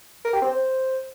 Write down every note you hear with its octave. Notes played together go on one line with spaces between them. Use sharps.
A#4
G4
C4
C5